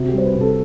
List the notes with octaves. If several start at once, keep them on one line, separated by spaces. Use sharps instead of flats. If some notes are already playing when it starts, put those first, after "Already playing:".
Already playing: C3 F#4
G4
G3 C5
B4
C3
A4